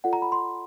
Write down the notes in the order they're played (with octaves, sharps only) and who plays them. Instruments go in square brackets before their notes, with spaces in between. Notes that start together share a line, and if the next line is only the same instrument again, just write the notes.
[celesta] F4 A4 D5 F#5
A#5
B5
C6